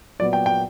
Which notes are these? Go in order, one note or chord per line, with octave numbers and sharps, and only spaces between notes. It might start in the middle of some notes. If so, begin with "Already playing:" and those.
A#2 F#3 B3 D5
G5
G5